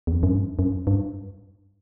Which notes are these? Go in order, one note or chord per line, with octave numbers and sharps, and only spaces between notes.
E2
F2
F#2
G2
F#2
G2